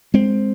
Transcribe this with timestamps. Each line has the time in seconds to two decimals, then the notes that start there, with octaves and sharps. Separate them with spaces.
0.14 G#3 C4